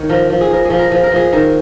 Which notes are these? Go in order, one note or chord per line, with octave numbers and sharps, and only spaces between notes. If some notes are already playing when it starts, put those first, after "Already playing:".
Already playing: D#3 C#5
F3 A#4
F3
G#4
F3 A#4
F3 G#4
A#4
F3 G#4
A#4
F3 G#4
D#3 A#4